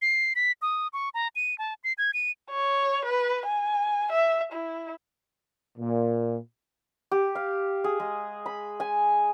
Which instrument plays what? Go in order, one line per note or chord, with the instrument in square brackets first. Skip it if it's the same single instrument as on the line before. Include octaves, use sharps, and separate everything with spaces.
[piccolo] C7
B6
D#6
C#6
A#5
D#7
A5
C7
G#6
D#7
[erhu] C#5
B4
G#5
E5
E4
[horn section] A#2
[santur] G4
F5
G#4
G#3
B5
G#5